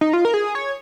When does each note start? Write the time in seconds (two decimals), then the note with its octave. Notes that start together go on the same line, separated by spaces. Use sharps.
0.01 D#4
0.13 F4
0.25 A#4
0.34 G#4
0.55 C#5